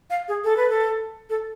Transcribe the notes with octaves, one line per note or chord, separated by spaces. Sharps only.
F5
G#4
A4
B4
A4
A4